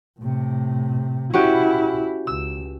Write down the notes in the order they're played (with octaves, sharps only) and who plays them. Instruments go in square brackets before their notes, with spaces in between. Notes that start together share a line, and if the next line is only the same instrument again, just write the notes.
[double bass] A2 C3
[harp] C#4 F#4 G4 [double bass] E4
[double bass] C#2 [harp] E6